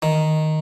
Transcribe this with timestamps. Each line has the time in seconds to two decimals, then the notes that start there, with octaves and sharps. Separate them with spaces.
0.02 D#3